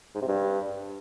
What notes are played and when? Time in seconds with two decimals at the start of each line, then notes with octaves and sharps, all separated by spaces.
0.15 G#2
0.21 C3
0.28 G2